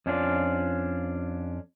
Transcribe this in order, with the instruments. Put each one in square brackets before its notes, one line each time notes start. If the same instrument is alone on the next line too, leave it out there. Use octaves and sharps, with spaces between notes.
[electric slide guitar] F2 C#4 D4 F4 D5